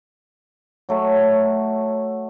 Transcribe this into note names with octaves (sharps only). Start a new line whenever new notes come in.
F#3 A3